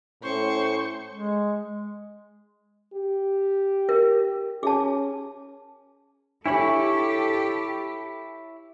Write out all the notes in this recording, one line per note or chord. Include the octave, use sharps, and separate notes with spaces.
A2 C#4 C5 C#6
G#3
G4
A#4
C#4 G#4 A5
D4 E4 G4 A4 C#5 B5